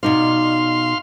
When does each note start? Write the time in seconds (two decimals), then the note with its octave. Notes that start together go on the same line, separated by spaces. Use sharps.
0.03 B2 D#4 D5 F5 C6